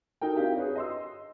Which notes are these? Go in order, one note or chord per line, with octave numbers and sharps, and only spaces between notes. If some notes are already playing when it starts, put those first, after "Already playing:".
D#4 A4 A#4 G5
C4 D4 E4 G4 F5
G#4 B4 C#5
D#5 C6 E6